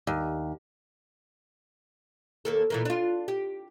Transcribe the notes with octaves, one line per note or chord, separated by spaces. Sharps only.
D#2
D#2 A#3 A4
A#2 E3 A#3
D4 F4
G4